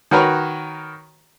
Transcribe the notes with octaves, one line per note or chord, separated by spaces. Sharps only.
D#3 F#4 A#4 B4 C#5 A#5